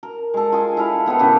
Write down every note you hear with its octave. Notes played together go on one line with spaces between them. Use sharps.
A#4
G#3 A4
F4 G#4 G#5
E4 A4 F5 B5
D#3 B3 C4 A4
A2 C#3 B3 G4